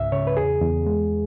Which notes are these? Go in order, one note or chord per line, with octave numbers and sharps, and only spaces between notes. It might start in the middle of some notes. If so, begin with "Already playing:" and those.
Already playing: C#2 G#2 E5
C#3 C#5
B4
E2 G#4
E2
G#3